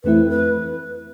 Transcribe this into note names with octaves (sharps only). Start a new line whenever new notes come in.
F2 E3 A3 C4 E4 B4
B4